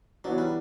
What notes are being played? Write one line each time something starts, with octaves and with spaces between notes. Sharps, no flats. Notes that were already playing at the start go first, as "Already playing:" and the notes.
E3 F#3 B3 D4
G3